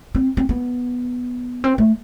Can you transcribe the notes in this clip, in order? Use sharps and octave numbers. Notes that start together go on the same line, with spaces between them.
C4
C4
B3
C4
A3